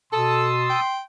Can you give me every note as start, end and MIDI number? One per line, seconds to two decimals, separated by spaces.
0.13 0.76 47
0.13 0.50 69
0.13 0.80 81
0.13 1.02 84
0.13 0.80 87
0.13 0.80 88
0.69 1.01 79